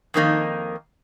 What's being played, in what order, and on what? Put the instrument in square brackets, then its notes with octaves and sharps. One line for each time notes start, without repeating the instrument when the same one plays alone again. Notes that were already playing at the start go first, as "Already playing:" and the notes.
[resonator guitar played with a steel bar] F2 D#3 A#3 D#4